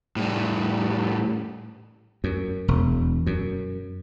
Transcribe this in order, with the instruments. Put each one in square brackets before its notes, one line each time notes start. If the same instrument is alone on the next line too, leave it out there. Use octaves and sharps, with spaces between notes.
[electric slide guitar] A2 G3
[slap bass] F#2
E1
F#2